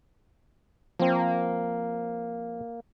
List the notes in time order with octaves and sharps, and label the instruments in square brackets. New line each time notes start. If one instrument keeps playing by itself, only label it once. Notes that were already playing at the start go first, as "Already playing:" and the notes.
[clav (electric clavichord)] F3 C4 [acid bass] A#3